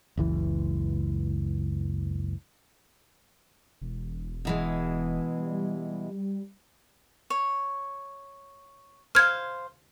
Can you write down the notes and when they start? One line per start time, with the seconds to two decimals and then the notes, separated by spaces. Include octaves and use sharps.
0.17 F#1 C#2 E3
3.81 E1
4.45 B2 E3 G#3
5.38 G3
7.30 C#5
9.15 C5 F5 F6 G#6